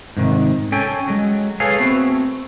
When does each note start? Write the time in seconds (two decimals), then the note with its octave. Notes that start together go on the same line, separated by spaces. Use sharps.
0.17 G#2 C3 D#3
0.72 C#4 A4 G5 G#5
1.08 F#3 G#3
1.60 G#4 A4 B4 C#5 F5 G#5
1.79 A3 B3 C4 F#4